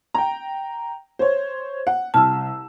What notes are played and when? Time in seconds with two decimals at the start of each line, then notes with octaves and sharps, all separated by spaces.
0.14 G5 A#5
1.19 C5 C#5
1.87 F#5
2.14 C2 A5 E6 F6